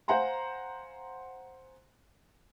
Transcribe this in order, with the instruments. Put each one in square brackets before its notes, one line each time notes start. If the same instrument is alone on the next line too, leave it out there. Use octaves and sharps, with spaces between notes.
[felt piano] C5 F5 F#5 G#5 A#5 C6